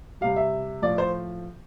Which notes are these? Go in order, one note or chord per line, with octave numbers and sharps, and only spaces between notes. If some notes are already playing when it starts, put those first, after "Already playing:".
C3 G3 F5
E5
A2 F3 D5
C5